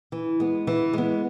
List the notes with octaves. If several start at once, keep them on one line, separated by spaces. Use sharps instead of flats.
E3
G#3 B3
E3
G#3 B3